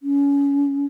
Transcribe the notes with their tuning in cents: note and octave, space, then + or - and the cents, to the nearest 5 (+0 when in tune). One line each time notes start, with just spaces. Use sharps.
C#4 +25